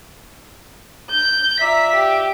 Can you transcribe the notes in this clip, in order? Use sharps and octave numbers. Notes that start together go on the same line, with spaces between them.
G6
F4 D5 E5 A#5 B6
G4